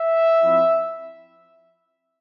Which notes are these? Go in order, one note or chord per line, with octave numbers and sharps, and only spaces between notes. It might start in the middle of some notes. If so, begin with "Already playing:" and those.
Already playing: E5
F3 C4 E4